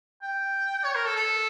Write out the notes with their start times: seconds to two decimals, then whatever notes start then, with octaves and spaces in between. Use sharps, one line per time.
0.22 G5
0.84 C#5
0.95 A#4
1.06 A4
1.16 A4